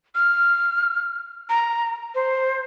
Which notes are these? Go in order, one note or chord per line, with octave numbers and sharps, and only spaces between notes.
F6
A#5
C5